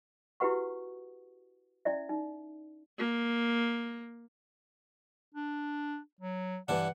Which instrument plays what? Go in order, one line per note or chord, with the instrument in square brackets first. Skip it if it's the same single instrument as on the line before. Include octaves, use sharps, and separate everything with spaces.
[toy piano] E4 F#4 G4 B4 F#5 C#6
C#4 E4 D5 E5
D#4
[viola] A#3
[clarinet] D4
F#3
[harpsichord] G2 E3 D4 [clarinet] F#5